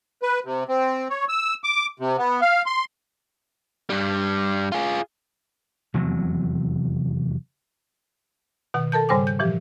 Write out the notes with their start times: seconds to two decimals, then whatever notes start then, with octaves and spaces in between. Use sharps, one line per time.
0.22 B4
0.45 C3
0.69 C4
1.10 C#5
1.29 E6
1.64 D6
2.00 C3
2.18 B3
2.41 F5
2.66 C6
3.90 G2 G3
4.72 F4 G#4
5.94 F1 E2 C3 F#3
8.74 B2 D#3 F#5
8.92 A4 A#4 A5 G6
9.09 G#2 C#3 G3 C5 G#5 D6
9.27 G6
9.39 A#2 E3 F3 G4